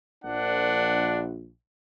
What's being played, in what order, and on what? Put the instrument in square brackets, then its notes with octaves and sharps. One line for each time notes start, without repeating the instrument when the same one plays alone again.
[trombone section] A#1 [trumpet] D4 [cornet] F#5